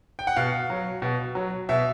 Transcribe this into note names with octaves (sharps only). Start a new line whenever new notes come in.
G5
F#5
B2 F5
F#3
B2
F#3
B2 E5